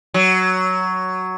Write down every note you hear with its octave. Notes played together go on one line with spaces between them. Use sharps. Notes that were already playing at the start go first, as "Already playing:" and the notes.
F#3